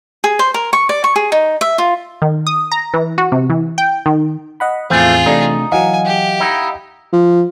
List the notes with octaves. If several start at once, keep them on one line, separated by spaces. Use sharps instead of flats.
G#4
C5
A#4
C#6
D5
C#6
G#4
D#4
E5
F4
D#3
D#6
A#5
E3
F#4
C3
E3
G5
D#3
D#5 F#5 B5
E2 A2 E3 F3 A3 C4 F4 G#4
C3 A3 D4 D#4
E3 F#3 D#5 F5 F#5 G#5
G4
D#4 E4
F3